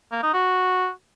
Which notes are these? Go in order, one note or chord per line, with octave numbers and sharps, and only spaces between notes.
A#3
D#4
F#4